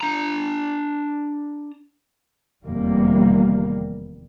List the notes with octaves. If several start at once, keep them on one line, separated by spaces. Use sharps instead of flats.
D4 A#5
F1 E2 C3 D#3 G3 A#3